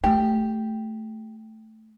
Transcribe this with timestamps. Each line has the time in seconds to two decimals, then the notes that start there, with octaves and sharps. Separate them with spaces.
0.04 A3 G4